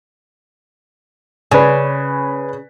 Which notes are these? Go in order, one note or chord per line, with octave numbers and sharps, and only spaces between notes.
C#3 B4 D5 G#5